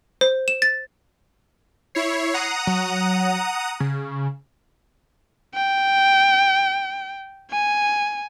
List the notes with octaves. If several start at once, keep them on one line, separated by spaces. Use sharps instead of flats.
C5
E7
A6
E4 C#5 C7
F#5 A#5 D#6
F#3
C#3
G5
G#5